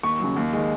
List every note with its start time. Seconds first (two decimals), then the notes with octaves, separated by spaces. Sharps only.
0.03 D#2 C#6
0.20 C#3 F#3
0.36 D#2
0.53 D#3 G#3